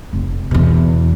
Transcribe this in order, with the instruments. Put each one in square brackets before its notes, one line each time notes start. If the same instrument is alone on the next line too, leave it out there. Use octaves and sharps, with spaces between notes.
[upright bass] F1
E2 B2